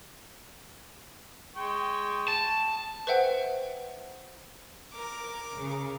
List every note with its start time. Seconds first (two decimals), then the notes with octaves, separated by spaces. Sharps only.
1.56 G#3 G5 C#6
2.28 A5
3.07 B4 C5 E5 F#5 G5
4.92 A#4 D6
5.55 C#3